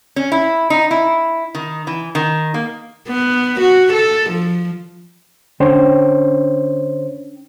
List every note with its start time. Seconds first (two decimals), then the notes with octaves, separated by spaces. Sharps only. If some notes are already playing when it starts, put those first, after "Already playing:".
0.16 C#4
0.32 E4
0.70 D#4
0.91 E4
1.55 D#3
1.87 E3
2.15 D#3
2.54 A#3
3.08 B3
3.60 F#4
3.93 A4
4.30 F3
5.60 D3 C#4 D4 C5 C#5 G5